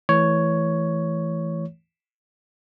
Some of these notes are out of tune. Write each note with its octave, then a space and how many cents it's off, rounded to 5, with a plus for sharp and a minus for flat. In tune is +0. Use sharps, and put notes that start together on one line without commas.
E3 +0 A3 -10 C#5 +5